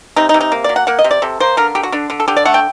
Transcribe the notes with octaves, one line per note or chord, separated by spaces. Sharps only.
C3 D#4
D#4
C3
D#4
A#3
F#3 D5
F#5
A#3 F#5
D#5
C3
D5
C3 A4
A#3 C5
D3 A#4
D3 G4
F#4
D3 D4
D3
A4
D3 G4
D5
A3 F#5
G5